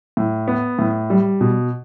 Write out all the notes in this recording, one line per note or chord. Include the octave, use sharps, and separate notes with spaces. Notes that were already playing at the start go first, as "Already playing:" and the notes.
A2
B3
A2
G3
B2